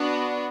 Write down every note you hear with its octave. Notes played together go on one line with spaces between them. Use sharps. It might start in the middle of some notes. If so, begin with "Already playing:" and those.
Already playing: B3 D4 F#4